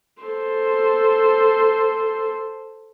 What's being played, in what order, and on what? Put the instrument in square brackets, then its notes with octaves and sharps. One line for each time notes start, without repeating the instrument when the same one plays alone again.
[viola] A4 C5